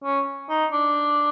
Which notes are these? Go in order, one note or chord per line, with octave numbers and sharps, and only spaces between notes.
C#4
D#4
D4